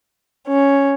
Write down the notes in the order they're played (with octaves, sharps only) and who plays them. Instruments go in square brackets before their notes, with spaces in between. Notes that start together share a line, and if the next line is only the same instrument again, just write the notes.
[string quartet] C#4